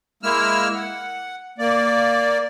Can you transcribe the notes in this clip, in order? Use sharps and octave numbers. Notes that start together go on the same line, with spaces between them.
G#3 A#3 E4 E6 F6
F#5
A#3 D5